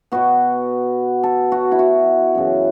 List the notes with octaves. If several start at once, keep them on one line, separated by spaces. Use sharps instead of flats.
B2 B3 F#4
A4
F#4
E4
F#4
F#2 C#3 E3